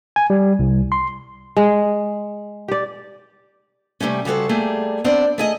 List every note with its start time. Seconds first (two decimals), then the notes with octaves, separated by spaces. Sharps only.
0.16 G#5
0.30 G3
0.59 C2
0.92 C6
1.57 G#3
2.68 G4 D5
4.00 C3 F#3 G3 A3 C#4
4.25 C#3 G3 F#4 A4 C5
4.49 G3 A3 A#3 G#4
5.04 B3 C4 D4 C5 D5
5.38 A3 G#4 D#5